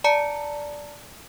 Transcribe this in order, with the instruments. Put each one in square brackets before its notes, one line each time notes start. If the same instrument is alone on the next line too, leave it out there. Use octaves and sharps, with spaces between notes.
[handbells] D5 A5 A#5 C#7